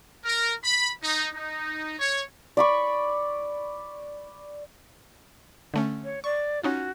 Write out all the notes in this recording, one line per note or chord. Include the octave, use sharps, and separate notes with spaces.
A#4
B5
D#4
D#4
C#5
D5 B5 C#6
D3 A3 C#4
C#5
D5 C#6
C#4 D#4 F4 F#4